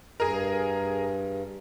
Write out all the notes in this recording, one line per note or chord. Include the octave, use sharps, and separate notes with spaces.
G2 G#4 A#4